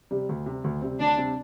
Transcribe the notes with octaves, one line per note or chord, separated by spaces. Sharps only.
C3 G3
D2
C3 G3
D2
C3 G3 C4
D2 D4
C3 G3 C4